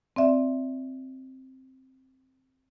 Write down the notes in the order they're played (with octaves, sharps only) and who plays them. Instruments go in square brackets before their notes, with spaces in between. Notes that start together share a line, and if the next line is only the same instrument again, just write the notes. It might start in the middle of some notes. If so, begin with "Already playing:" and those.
[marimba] C4 D5 E5